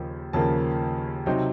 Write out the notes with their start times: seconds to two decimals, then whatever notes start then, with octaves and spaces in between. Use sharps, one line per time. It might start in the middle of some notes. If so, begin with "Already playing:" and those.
Already playing: D#2 C#3 F3 A#3
0.33 D#2 C#3 F3 A#3 A5
1.26 C3 F#3 C4 D#4